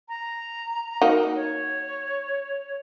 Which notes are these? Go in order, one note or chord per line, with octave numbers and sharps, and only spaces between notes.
A#5
A#3 D#4 F#4
C#5